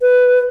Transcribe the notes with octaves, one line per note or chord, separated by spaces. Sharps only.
B4